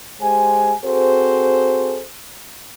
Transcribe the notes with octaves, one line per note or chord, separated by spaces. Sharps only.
G#3 G4 C5 G#5
C4 F#4 G#4 A4 C5